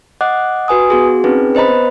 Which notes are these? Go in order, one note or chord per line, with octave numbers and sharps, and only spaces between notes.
D#5 F#5 D6 F#6
F#4 B4 G#5 D#6
B3 F#4 G#4
C4 C#4 D#4 G#4 B4
B4 C5 D#5 A#5 B5
B3